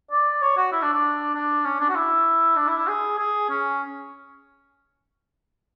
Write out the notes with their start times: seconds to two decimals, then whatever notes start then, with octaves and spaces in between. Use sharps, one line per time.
0.11 D5
0.42 C#5
0.57 F#4
0.72 E4
0.82 D4
0.93 D4
1.35 D4
1.65 C#4
1.80 D4
1.89 F#4
1.95 E4
2.56 D4
2.67 E4
2.78 E4
2.88 G#4
3.19 G#4
3.50 C#4